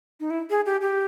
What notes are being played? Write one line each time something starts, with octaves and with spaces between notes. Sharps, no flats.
D#4
E4
G#4
G4
G4